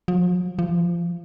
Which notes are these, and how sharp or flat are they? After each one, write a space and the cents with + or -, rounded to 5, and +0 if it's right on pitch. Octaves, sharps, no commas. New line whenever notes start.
F3 +40
F3 -20